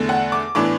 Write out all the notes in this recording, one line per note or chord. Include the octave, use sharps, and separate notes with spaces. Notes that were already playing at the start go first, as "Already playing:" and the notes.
Already playing: E2 D3 A3
F#5
D6
A2 E3 B3 D4 D6